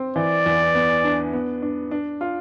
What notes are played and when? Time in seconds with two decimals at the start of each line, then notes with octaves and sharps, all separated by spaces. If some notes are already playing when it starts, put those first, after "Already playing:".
Already playing: C4
0.16 E3 D5
0.46 E2
0.75 B3
1.04 D4
1.33 B3
1.62 D4
1.91 D4
2.21 F4